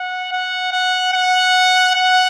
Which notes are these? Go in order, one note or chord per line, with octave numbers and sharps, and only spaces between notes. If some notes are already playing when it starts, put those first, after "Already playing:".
Already playing: F#5
F#5
F#5
F#5
F#5